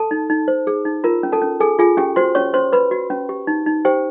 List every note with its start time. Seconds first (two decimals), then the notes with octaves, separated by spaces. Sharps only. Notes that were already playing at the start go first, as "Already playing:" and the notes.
Already playing: A4 A5
0.11 D#4
0.30 D#4
0.48 C5
0.67 G#4
0.85 D#4
1.04 F4 A#4 A#5
1.23 C#4
1.32 A4 A5
1.41 C#4
1.60 G#4 A4 G#5
1.79 F4 G#4 G#5
1.97 C#4 G4 G5
2.16 F#4 C5 C6
2.35 C#4 C#5 C#6
2.54 C#4 C5 C6
2.73 B4 B5
2.91 F#4
3.10 C#4
3.29 G4
3.47 D#4
3.66 D#4
3.85 G4 C5 G5